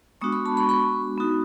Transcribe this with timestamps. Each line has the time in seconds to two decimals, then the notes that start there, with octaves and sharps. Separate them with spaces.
0.21 G#3 B3 D4 F#4 C#6 D#6
0.32 B5 C#6
0.45 A5 B5
0.57 B5 C#6
0.69 B5 C#6
1.18 B3 D#4 F#4